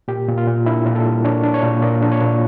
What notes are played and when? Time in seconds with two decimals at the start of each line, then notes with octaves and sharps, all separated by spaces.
0.08 A#2 G4
0.28 A#2
0.38 F4
0.48 A#2
0.66 D4 E4
0.86 A#2
0.95 A4
1.05 G3
1.25 D4 C#5
1.44 D4
1.54 C#5
1.63 A#2
1.82 A#2 D5
2.02 D4
2.12 C#5
2.22 A#2